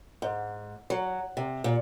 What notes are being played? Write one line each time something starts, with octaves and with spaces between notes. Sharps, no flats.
G#2
F#3
C3
A#2